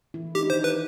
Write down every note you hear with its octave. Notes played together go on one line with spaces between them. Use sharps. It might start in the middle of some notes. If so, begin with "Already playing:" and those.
E3 E4
D#4 G4
D4
D#3 D#4 C5
B4